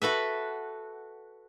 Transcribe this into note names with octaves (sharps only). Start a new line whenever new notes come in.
F#4 A4 B4 E5